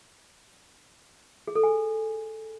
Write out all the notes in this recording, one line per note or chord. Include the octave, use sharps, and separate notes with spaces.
G#4
A4
G#5